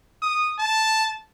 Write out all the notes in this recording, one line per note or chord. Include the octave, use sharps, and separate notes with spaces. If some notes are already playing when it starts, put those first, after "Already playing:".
D#6
A5